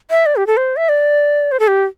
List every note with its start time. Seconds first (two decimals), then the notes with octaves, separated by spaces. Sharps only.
0.11 E5
0.26 D5
0.36 G4
0.47 A4
0.57 C5
0.77 E5
0.89 D5
1.52 C5
1.60 A4
1.68 G4